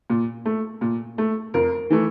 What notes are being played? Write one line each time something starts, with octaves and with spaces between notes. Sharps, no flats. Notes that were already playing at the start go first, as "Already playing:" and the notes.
A#2
A3
A#2
A3
F2 A#4
E3 A3